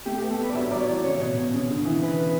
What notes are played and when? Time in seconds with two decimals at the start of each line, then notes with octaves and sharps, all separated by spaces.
0.06 A3 G4
0.18 G4
0.23 B3
0.31 A4
0.39 G3 B4
0.50 D5
0.55 F#3 E5
0.71 F#3 D5
0.80 C#5
0.88 E3 D5
1.04 C#3 C#5
1.20 B2
1.36 B2
1.53 C#3
1.70 D3
1.85 E3
2.03 B4